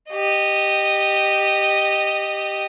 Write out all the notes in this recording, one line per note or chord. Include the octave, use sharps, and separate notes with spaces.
G4 D#5